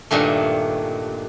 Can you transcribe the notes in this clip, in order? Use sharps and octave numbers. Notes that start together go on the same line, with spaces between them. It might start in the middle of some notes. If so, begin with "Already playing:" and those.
G2 A#2 D#3 A3